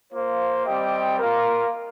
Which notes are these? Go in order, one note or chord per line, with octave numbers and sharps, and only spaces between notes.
A#3 F4 C5
G3 C4 G4 D#5 G5
A#3 F4 A#4